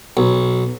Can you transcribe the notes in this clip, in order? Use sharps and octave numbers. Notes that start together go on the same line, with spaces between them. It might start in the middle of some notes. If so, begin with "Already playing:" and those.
B1